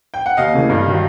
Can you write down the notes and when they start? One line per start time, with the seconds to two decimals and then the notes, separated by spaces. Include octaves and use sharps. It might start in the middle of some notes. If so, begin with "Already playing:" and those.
0.14 G5
0.26 F#5
0.37 D#2 D#5 F5
0.54 C#3 E3 A3
0.70 G2
0.86 D#3 F#3